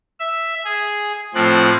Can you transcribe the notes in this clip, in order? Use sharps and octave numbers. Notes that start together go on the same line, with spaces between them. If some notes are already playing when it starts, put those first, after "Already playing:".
E5
G#4
A2 F3 C4 F#6